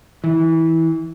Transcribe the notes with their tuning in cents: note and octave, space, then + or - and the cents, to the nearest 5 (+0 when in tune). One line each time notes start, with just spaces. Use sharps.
E3 -20